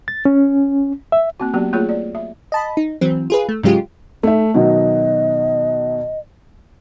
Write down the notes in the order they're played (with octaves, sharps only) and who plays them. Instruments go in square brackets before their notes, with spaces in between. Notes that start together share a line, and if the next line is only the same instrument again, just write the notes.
[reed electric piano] A6
C#4
E5
[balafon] A#3 C4 F#4
F#3 A#3 B3 C#4 F#4 G4
A3 A#3 F4 G#4 C#5
D5
E5
[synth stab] D#5 A5 B5
D#4
E3 F#3 C4
F4 G#4 B4
A3
G#2 C#3 F#3 G#3 F4 G4
[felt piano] A3 E5 [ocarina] D#4
[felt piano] B2 D#3 F#3 [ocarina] D#5